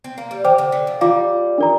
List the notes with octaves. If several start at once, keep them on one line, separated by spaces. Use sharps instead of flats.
C4
A#3
G3
F3 C5 G5 D6
D3
D3
F3
G3 F4 D5 F5 D6
D4 A#4 D5 A#5